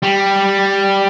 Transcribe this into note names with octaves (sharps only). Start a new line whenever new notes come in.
G3